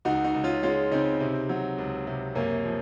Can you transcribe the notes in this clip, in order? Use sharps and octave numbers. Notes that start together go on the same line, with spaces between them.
C#2 D#4 F#4
D#4 F#4
C#2
C#4 F4
G#3 C#4 F4
C#3 C4 D#4
C3
F#3
C#2
C3
F#2 A#3 C#4
F3